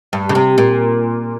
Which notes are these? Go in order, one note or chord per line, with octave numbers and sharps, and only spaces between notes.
G2
C#3
C3
A#2